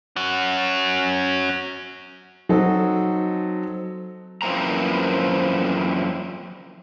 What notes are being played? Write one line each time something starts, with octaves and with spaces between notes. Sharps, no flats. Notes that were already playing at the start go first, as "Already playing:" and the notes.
C#4 F#4
F#3 C4 D#4 A4
F#2 E3 F3 A#3 C4 A#5